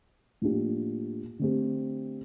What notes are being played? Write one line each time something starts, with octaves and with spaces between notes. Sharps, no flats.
A2 F3 A#3 D4 G4
D3 A3 C4 G4